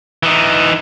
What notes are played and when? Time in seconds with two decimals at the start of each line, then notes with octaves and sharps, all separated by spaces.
0.23 E3 D#4